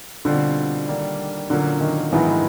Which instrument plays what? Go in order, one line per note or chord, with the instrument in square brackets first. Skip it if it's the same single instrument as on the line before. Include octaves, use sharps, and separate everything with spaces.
[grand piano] B2 G3 C4 F4 [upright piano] D3
[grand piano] D#3 G3 A#3 D4
[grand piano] A#2 F#3 A#3 C#4 [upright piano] D3
[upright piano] D#3
[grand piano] G#2 D#3 F#3 B3 D#4 [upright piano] E3